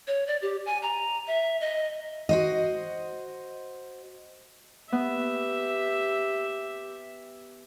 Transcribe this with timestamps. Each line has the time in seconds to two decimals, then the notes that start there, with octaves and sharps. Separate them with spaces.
0.07 C#5
0.27 D5
0.42 G4
0.66 G#5
0.82 A#5
1.27 E5
1.60 D#5
2.29 F#4 C5 D#5
4.92 B3 G4 E5